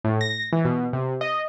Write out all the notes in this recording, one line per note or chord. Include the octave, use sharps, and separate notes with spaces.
A2
A#6
E3
B2
C3
D#5